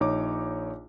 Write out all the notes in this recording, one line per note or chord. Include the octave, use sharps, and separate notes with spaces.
A#1 D#4 C#5 D6